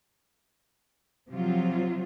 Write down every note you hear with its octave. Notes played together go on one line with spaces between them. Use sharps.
C3 F3 F#3 F4